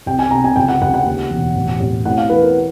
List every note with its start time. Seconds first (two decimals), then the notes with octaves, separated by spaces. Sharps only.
0.06 C2 G5
0.19 G#5
0.31 C3 A#5
0.44 G#5
0.56 C#2 G5
0.69 F#5
0.82 C#2 F#5
0.94 F#5
1.06 D#2
1.30 E1
1.55 A1
1.80 A1
2.05 A2 F#5
2.17 F5
2.29 E3 B4
2.43 A#4